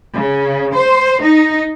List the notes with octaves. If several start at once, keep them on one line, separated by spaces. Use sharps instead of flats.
C#3
C5
D#4